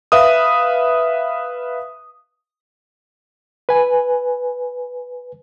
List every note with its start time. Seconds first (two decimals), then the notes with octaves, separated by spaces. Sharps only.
0.12 B4 E5 F5 D#6
3.69 B4 G#5